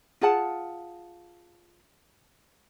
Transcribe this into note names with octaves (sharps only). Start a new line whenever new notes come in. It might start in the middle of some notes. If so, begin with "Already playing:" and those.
F4 G#4 F#5 A5